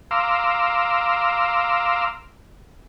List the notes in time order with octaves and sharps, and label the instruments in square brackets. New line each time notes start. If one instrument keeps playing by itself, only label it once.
[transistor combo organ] F5 A#5 C6 D6 E6